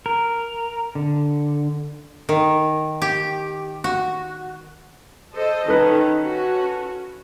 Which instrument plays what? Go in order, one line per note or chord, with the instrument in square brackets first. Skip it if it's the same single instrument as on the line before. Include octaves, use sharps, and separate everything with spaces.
[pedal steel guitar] A#4
D3
[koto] D#3
G4
F#4
[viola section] A4 C5 D#5
[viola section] D#3 C#4 [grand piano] A4 B4
[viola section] C#4 F#4